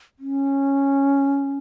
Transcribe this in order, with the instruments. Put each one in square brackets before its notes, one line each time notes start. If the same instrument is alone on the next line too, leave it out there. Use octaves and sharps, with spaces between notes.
[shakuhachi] C#4